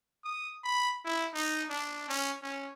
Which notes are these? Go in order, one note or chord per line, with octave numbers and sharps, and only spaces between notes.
D#6
B5
E4
D#4
D4
C#4
C#4